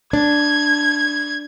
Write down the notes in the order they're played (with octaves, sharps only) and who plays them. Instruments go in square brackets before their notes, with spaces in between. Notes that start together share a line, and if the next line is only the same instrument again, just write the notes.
[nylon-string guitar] D4 [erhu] G#6